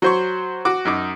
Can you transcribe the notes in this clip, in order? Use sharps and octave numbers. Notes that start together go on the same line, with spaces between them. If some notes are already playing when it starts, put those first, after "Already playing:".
F#3 C5 C#6
F#4 D6
F#2 D#4 D6